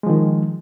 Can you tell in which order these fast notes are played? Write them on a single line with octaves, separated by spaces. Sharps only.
G#3 F3 D#3